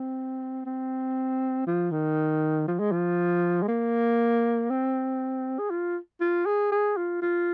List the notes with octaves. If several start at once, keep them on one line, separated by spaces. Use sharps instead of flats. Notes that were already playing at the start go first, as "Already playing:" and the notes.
Already playing: C4
C4
F3
D#3
F3
G#3
F3
G#3
A#3
C4
G#4
F4
F4
G#4
G#4
F4
F4